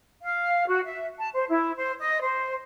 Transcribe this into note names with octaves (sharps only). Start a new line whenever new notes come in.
F5
F#4
E5
A5
C5
E4
C5
D#5
C5